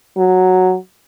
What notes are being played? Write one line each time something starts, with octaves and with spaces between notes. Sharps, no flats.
F#3